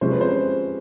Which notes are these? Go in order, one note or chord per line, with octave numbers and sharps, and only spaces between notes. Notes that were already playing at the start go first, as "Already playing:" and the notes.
C3 F3 G#3 C#4 C5
B4
C5